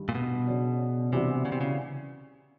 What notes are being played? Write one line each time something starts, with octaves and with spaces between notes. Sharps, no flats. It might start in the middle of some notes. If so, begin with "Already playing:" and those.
Already playing: G2 D#3 G3
A#2
B2
C#3 F#3 B3 D4
C3 E3 G3 B3 D4 F#4
C#3
C3
C#3